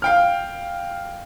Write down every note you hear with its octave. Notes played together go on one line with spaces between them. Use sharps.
F5 G5 F6